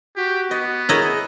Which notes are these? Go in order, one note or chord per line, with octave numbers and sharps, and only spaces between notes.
F#4 G4
B3 D#5
E4 F#4 G#4 A#4 C#5 D#5